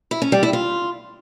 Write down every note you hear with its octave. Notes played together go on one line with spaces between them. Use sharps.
E4
C#4
G3
E4
F4